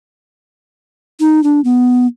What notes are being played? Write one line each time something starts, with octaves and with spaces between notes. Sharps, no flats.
D#4
D4
B3